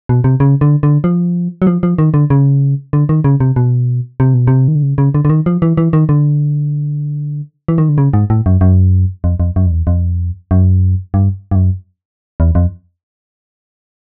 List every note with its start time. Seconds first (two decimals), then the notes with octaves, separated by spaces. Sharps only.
0.09 B2
0.24 C3
0.40 C#3
0.61 D3
0.83 D3
1.04 F3
1.62 F#3
1.67 F3
1.83 F3
1.98 D#3
2.14 D3
2.30 C#3
2.93 D3
3.09 D#3
3.24 C#3
3.40 C3
3.56 B2
4.20 C3
4.34 B2
4.47 C3
4.68 D#3
4.75 D3
4.83 C#3
4.98 C#3
5.15 D3
5.25 D3
5.29 D#3
5.46 F3
5.62 E3
5.77 E3
5.93 D#3
6.09 D3
7.68 E3
7.78 D#3
7.89 D3
7.98 C#3
8.14 G#2
8.30 A2
8.46 F#2
8.61 F#2
9.24 F2
9.40 F2
9.56 F#2
9.66 F2
9.71 E2
9.87 F2
10.51 F#2
11.14 G2
11.51 G2
11.55 F#2
12.40 E2
12.55 F2